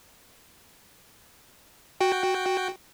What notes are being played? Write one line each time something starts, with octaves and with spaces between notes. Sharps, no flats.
F#4 G5